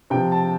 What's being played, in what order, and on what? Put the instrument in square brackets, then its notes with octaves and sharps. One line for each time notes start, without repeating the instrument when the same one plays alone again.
[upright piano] C3 F3 G5
A5